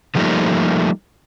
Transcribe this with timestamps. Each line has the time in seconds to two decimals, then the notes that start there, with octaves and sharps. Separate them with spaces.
0.15 D3 F3 G3 A3 A#3 D#4